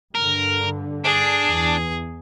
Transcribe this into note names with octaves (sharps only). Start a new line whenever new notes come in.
G2 D3 A#4
D4 G#4
E2